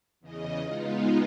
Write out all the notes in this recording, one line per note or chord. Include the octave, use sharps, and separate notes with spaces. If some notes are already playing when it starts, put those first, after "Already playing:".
E2 C#3 D#5
G#3 B3 D#4 F4